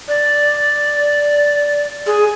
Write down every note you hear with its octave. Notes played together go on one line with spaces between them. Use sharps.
D5
G#4